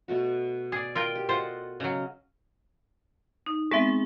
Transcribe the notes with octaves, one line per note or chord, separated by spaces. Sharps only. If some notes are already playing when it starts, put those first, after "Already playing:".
B2 A3 F#4
G#4 D5
F4 A#4 G5
G4
F4 A4 C5 D#5 F#5
C#3 F#3 D#5 F5
D#4
G#3 B3 C4 G#4 E5